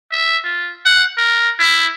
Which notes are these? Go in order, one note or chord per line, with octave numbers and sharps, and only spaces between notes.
E5
F4
F#5
A#4
E4